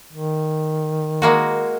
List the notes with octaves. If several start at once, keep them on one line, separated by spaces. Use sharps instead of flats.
D#3
G#3 A#3 F#4